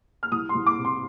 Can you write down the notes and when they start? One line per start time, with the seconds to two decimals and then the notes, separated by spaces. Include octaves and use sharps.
0.23 F6
0.32 C2 D#6
0.49 C6
0.55 C2
0.66 D6
0.79 C3
0.85 C6